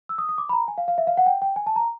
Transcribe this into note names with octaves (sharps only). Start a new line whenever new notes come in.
E6
D#6
D#6
D6
B5
A#5
G#5
F5
F5
E5
F5
F#5
G5
G5
G#5
A5
A#5